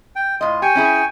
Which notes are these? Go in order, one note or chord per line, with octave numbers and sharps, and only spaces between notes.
G5
A2 F4 D#5
G4 G5 G#5 C#6
C#4 E4 G#4